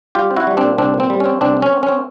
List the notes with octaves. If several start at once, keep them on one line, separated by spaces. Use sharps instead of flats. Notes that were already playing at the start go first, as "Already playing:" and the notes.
G3 F4 G4
C4
E4 F#4
G3
C4 D4
A#2
C2 C4 D4
A#2
C4
G3
C#4
C4
C2 C4 D4
C4
C#4
C4
C#4
C4